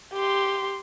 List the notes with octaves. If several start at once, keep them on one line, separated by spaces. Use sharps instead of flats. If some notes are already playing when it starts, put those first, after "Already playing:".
G4 C6